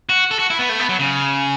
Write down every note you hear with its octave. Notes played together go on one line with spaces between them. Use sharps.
F#4
A4
F#4
E4
B3
A3
B3
F#3
C#3